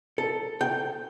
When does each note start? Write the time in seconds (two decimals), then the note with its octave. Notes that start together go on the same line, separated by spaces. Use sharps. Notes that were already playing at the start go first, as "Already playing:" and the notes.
0.18 A4
0.61 G5